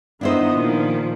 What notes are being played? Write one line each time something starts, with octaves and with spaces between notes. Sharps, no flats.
D#3 B3 D4 E4 C5 D#5
A#2 D#3 F3